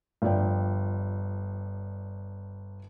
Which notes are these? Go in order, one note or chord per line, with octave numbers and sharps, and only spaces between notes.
G1 F3 D5 G5